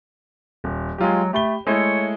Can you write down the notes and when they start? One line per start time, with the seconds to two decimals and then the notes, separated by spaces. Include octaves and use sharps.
0.64 D#1
0.98 F#3 G#3 F4 G4
1.33 A3 G4 B5 G7
1.67 G#3 A3 E4 C#5